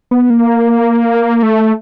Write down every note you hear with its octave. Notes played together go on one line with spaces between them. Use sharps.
B3
A#3
A3